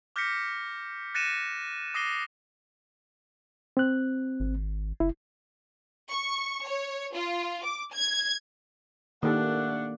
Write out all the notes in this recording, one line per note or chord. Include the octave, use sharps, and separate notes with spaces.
D6 F6 G6 A#6 B6 C#7
F#6 A6 A#6 C#7 D#7 E7
D6 D#6 A#6 C7 D#7 G7
C4 F#6
G#1
F#1 E4
C#6
C#5
F4
D6
G#6
D#3 A3 A#3 D4 G4 A4 F#5